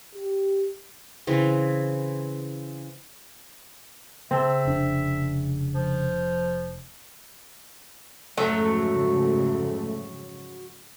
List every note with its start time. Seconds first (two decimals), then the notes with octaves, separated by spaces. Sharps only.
0.15 G4
1.27 C#3 E3 C4
4.31 C#3 C4 G#4 E5 A5
4.65 F1 D4
5.74 F3
8.37 F2 G#2 C#3 F#3 A3